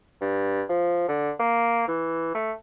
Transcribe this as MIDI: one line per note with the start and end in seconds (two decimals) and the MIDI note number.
0.21 0.62 43
0.69 1.06 53
1.08 1.31 50
1.39 1.87 58
1.88 2.30 52
2.34 2.52 57